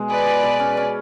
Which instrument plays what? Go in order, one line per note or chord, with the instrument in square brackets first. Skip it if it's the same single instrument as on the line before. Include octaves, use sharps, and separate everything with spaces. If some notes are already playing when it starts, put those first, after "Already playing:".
Already playing: [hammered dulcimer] B2 G#3
[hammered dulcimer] G#4 [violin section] B4 D5
[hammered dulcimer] G#4
B2
C#4
C#4